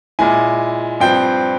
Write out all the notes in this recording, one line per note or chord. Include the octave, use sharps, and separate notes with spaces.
A#2 G#3 E4 G#5
G2 F3 C4 G5